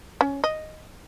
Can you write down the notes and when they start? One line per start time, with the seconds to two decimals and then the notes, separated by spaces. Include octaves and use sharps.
0.21 C#4
0.44 D#5